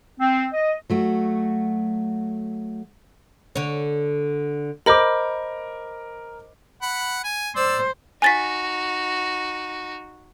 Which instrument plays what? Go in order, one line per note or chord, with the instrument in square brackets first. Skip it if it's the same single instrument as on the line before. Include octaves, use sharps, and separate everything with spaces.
[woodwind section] C4
D#5
[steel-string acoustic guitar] F#3 A3 F#4
[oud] D3 C#5
[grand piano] A#4 D6 [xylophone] C5 D#5 B5
[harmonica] F#5 B5
G#5
[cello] C5 [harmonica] D5 E6
[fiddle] D#4 F#4 [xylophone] G#5 A6 B6